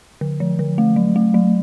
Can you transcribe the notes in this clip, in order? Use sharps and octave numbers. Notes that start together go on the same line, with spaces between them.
D3
F3
D3
A3
F#3
A3
F#3